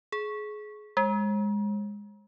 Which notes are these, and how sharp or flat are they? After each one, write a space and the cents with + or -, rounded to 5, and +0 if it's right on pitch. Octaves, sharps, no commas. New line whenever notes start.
G#4 +25
G#3 -15